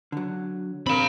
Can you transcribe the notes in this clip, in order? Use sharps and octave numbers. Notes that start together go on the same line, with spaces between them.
D3 F#3
C4 D4 A#4 F5 B5